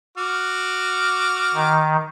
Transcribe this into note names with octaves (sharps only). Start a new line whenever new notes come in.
F#4 D6 F6
D#3